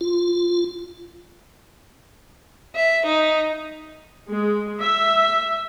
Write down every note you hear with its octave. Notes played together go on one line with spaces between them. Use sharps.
F4
E5
D#4
G#3
E5